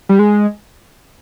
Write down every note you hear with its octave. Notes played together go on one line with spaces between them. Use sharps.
G3
G#3